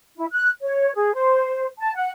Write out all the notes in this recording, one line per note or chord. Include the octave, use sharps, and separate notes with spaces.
E4
F#6
C#5
G#4
C5
A5
F#5